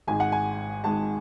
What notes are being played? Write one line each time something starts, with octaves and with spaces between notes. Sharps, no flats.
G#1 G#2 G#3 G#5
F#5
G#5
G#1 G#2 G#3 A5